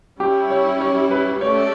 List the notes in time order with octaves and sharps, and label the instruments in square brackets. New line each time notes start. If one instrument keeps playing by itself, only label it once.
[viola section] G3 C#4 E4 [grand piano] G4
[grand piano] C#5
C#5
B4
[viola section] A3 C#4 G4 D5 [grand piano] C#5